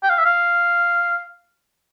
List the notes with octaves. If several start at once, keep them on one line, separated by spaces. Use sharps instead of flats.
G5
F5
E5
F5